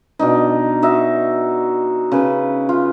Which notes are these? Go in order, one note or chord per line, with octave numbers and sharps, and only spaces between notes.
B2 D4 D#4
D#4 F#4 E5
C#3 B4
F4